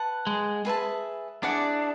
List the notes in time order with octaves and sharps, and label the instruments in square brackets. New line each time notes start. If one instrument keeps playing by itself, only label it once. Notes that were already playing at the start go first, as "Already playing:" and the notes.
Already playing: [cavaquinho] B4 F#5 A5
[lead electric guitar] G#3
[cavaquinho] G#4 B4 E5 A5
[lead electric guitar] D4 [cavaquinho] E4 G#4 D5 F#5